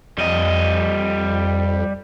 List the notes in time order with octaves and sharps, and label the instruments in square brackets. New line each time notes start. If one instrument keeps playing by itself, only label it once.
[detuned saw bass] F2 [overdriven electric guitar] G3 D#5